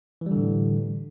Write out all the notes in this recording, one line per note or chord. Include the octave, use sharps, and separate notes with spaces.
A2 D3 E3 G3